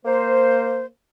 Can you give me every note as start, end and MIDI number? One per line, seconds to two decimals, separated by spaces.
0.05 0.85 58
0.05 0.85 72